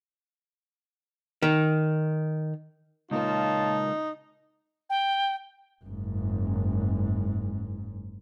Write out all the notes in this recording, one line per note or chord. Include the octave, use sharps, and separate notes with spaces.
D#3
C#2 A#2 A#3 D#4 F4 C#5 A5
G5
F#1 G#2